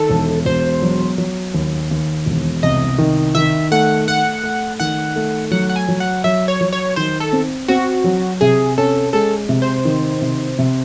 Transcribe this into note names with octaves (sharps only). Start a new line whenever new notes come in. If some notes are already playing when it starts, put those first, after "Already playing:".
Already playing: D#3 A4
E1
E1 C5
F#3
F#3
D#2
D#2
E1
C2 D#5
D#3
D#3 E5
A3 F#5
A3 F#5
A3
D#3 F#5
A3
F#3 F#5
F#5
G#5
F#3
F#5
F#3 E5
C#5
F#3
C#5
D#3 C5
A4
C4
C4 F#4
F#3
C3 G#4
C#4 A4
G#3 A4
C3
C5
D#3
C3
C3